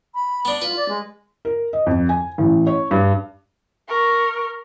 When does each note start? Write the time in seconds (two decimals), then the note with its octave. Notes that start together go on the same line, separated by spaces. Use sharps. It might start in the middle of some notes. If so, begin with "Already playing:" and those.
0.14 B5
0.45 B3 D4
0.62 F4 B4
0.76 D5
0.89 G#3
1.45 A#4
1.73 D#5
1.86 F2
2.09 G#5
2.38 A1
2.67 C#5
2.91 G2
3.88 A#4 C#6